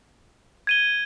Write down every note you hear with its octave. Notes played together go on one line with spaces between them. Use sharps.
G#6 D#7 G7